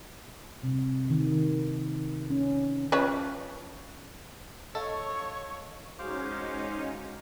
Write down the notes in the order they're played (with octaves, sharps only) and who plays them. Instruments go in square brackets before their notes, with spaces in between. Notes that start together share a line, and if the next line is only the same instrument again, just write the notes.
[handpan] C3
D#3
C#4
[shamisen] F3 C#4 B4
[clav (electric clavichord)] A4 [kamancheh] C#5 [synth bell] D#5 F5 [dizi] C#6
[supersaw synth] G#3 C#4 D#4 [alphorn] F#4 [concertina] C5 F5 D6